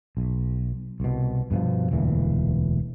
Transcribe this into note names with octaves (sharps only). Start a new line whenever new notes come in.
B1
C2 B2
G2 B2 D#3 F3
E1 D2 A#2 E3